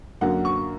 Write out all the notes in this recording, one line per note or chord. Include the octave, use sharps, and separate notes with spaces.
F#2 D3 F#3 A#3 F#5
C#6